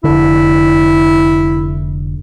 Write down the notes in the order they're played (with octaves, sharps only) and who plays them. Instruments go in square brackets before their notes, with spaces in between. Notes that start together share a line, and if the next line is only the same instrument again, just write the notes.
[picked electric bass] F1 D3 [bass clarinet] E4